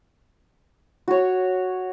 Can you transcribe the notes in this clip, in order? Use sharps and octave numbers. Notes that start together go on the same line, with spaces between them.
F#4 C#5